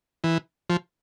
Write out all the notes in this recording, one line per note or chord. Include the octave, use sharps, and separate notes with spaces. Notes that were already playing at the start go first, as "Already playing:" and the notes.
E3
F3